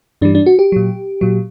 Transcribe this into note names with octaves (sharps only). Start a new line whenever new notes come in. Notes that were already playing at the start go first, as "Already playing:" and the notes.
G2 E3 G3 D4
D4
F#4
G4
A#2 F#3
A#2 F#3